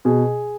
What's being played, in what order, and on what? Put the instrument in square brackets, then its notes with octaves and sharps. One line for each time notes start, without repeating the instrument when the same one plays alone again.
[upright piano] B2 G#4